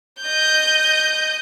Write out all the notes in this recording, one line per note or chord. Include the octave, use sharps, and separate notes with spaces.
D#5 G6